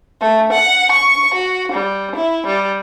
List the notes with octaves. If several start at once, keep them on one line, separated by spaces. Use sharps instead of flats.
A3
F#5
C#6
F#4
G3
E4
G3